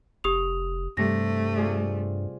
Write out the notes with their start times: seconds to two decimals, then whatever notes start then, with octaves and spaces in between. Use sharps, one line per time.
0.24 F1 G4 D#6 F7
0.97 G2 C3 G3 A3 A#6
1.56 F4 G#4 D5